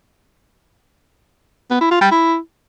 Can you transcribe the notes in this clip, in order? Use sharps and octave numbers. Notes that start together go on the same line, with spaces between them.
B3
E4
F4
G3
E4